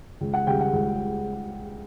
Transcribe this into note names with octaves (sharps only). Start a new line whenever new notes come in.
C#2
F#5
C#3 G3 G5
F#5
C#2